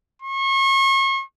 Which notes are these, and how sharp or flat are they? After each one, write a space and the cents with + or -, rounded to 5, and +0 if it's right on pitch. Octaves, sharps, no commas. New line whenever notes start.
C#6 -35